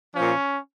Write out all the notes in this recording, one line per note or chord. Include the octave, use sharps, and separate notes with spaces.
A#2 F3 C#4